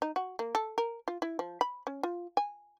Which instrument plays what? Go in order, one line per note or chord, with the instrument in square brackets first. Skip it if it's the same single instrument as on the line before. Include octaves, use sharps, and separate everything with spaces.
[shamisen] D#4
F#4
A#3
A4
A#4
F4
E4
F3
B5
C#4
F4
G#5